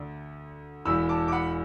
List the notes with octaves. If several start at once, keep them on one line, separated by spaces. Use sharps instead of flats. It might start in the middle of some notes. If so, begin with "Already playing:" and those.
Already playing: D2 D3 D5
E1 E2 E3 B5 E6
A5 D6
D6
F#5 B5